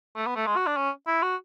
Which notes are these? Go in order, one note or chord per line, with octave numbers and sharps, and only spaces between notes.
A3
B3
A3
G#3
F#4
D4
C#4
E4
F#4